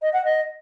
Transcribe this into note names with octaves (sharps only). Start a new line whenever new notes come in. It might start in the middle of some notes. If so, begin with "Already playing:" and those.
D#5
F#5
D#5